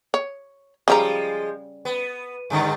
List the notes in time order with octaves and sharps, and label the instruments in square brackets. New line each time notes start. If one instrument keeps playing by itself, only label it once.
[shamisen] C#5
[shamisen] C#3 G3 A#5 [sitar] F3 G#3
[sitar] B3
G2 D3 D#3